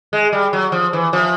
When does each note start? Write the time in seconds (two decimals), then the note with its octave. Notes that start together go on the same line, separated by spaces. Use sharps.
0.13 G#3
0.32 G3
0.53 F#3
0.72 F3
0.93 E3
1.13 F3